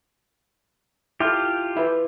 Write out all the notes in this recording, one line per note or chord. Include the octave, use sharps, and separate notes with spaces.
E4 F4 G4 A4
E4 B4